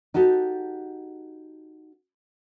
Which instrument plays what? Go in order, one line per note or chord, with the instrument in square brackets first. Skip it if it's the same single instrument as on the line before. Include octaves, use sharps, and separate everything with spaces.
[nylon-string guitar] D#4 F#4 G4 A4